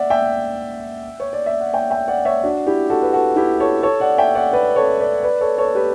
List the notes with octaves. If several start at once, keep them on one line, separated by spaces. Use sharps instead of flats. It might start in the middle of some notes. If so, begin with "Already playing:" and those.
Already playing: D5 E5 F#5
E5 G5
C#5
D5
E5
F#5
E5 G5
E5 G5
D5 F#5
C#5 E5
D4 F#4
E4 G4
F#4 A4
B4
F#4 A4
E4 G4
A4 C#5
A4 C#5
D5 F#5
E5 G5
D5 F#5
B4 D5
A4 C#5
B4 D5
B4 D5
A4 C#5
A4 C#5
G4 B4